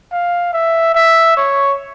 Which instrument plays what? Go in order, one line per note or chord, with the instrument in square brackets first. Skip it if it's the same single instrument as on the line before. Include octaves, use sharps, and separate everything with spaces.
[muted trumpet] F5
E5
E5
C#5